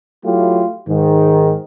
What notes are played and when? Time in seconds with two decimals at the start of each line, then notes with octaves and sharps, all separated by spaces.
0.25 F#3 A3 E4 F4 G4
0.88 G#2 D#3